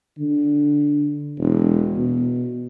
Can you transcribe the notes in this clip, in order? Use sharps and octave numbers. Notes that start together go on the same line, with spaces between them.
D3
E1
B2